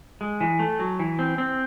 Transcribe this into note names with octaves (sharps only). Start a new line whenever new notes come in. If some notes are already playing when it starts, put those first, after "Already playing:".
G#3
E3
A3
F#3
E3
C4
C4